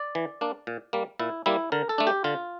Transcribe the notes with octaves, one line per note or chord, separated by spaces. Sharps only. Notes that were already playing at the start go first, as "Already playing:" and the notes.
Already playing: D5
E3
A#3 D4
A#2
G3 A#3
A#2 E4
G3 A#3 E4
D3 A#4
A4
A3 D4
G4
D3 F4